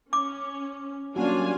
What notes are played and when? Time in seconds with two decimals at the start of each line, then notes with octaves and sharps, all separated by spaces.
0.13 C#4 D6
1.16 F#3 G3 A#3 C#4 D4 F4 F#4 G#5